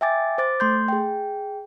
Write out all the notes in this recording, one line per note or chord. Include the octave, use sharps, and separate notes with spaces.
E5 G5 G#5 D6 A6
C5 D6 A6
A3 C6 G6
G#4 G5